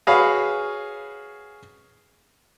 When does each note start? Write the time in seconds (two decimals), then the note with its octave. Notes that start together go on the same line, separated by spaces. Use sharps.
0.07 F#4 G#4 B4 C#5 F5